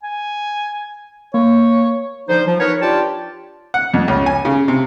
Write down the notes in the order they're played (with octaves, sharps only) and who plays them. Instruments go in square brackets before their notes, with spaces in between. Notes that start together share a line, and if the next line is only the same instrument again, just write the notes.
[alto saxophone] G#5
[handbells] A#3 [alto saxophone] C#5
[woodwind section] D3 F3 D#4 C5
F3
B3 D#4 A#4 B4 C#5
D4 F4 G4 D5 G5 A5
[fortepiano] F#5
F2
C#2
G#5
C#3
C3